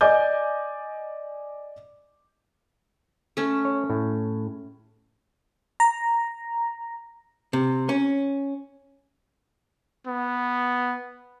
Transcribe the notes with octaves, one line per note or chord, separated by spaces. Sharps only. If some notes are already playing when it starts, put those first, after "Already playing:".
D5 D#5 G#5 D6 G6
A3 C#4
C#5
A2
A#5
C3
C#4
B3